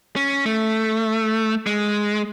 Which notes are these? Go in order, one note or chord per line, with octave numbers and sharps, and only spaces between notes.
C#4
A3
G#3